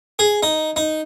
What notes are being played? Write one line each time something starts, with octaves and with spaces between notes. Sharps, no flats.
G#4
D#4
D#4